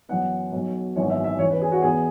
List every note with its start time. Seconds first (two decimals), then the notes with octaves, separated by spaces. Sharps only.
0.09 F#2 E3 B3 F#5
0.52 B1 B2 F#3
0.96 G#1 F#2 E3 B3 C#5
1.10 E5
1.24 E5
1.39 E2 E3 C#4 C#5
1.50 B4
1.61 G#4
1.72 F#4
1.82 E2 E3 B3 G#4